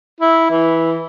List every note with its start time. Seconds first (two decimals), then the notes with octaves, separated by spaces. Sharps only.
0.21 E4
0.51 E3